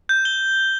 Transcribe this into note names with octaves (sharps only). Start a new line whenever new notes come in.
G6
G7